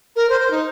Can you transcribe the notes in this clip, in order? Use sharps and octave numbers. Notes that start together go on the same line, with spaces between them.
A#4
C5
C5
D#4